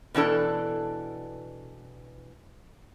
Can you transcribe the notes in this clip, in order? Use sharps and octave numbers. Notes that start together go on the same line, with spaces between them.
B2 E3 D4 A4